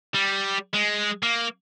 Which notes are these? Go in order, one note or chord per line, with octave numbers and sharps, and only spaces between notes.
G3
G#3
A#3